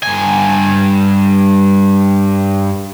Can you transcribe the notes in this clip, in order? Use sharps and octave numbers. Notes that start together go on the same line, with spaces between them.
G2 G#5